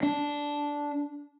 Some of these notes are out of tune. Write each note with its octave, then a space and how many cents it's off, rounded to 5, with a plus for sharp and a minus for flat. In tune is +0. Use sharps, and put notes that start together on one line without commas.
D4 -10